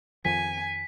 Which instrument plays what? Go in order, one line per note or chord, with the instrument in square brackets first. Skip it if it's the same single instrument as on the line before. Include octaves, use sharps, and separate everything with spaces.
[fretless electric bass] F2 D#3 F3 [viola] G#5 [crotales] B6